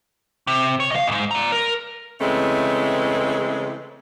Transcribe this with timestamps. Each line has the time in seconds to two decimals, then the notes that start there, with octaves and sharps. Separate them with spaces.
0.47 C3
0.80 C#5
0.92 D#5 F5
1.08 E2 G#2
1.31 D5 A#5
1.52 A#4
2.21 C#3 E3 G#3 A3 C4